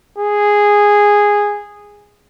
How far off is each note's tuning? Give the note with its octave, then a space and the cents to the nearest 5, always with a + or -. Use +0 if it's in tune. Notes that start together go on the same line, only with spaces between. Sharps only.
G#4 -10